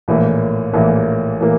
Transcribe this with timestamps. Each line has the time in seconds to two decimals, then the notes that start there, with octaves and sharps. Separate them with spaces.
0.08 A#1 A2 E3 A#3
0.73 A#1 A2 E3 A#3
1.41 A2 E3 A#3